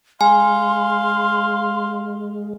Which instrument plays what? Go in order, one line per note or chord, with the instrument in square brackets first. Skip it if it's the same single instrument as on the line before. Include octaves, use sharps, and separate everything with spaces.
[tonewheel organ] G#3 [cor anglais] F5 [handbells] G#5 [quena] C6